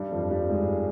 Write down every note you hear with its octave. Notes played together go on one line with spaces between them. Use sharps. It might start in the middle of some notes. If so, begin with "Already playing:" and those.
Already playing: G2 G3
F2 F3
G2 G3
G#2 G#3